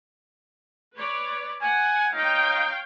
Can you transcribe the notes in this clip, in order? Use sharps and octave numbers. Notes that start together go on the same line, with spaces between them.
B4 C#5 D5
F#5 G#5
D#4 C#5 F5 G5